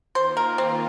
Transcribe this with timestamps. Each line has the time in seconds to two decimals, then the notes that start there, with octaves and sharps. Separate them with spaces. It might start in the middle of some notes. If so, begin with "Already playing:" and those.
0.15 D#3 A#3 F4 C5
0.37 A#4
0.58 C4